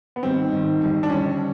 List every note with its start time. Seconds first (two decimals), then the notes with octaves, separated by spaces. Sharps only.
0.16 B3
0.23 G#2 D#3 G3 C4
0.52 G#2 D#3 G3
0.81 F2 D3 G3
1.03 D4
1.09 F2 D3 G3 C#4